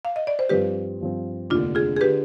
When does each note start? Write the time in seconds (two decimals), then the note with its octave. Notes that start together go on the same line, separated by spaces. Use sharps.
0.05 F5
0.16 D#5
0.27 D5
0.39 C5
0.49 G2 F3 C4 G4 B4
1.01 G2 F3 C4
1.50 F1 D#2 D3 D4 F4
1.75 F4 G#4
1.96 G#4
2.01 D3 G4 B4